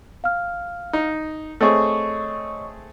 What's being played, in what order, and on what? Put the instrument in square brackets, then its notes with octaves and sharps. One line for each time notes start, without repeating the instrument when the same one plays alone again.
[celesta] F5 F6
[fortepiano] D#4
[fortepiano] A3 C4 G#4 [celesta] C#5 D#5 C#6